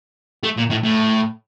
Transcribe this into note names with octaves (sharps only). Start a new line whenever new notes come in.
A3
A#2
A2
A2